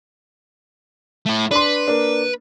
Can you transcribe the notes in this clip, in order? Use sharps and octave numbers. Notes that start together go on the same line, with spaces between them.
A3 E4
D4 B4 C6
A#3 D4